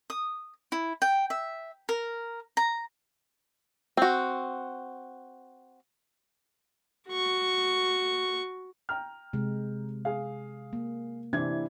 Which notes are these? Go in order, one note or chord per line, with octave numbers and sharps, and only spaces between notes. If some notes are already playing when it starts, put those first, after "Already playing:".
D#6
E4
G5
E5
A#4
A#5
C4 F#4
F#4 C#6
G5 A#5 F6
C3 G#3
G#4 F5
A#3
C3 E3 D4 E4 G#6